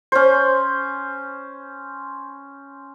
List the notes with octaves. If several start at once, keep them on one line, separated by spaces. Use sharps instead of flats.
C#4 C5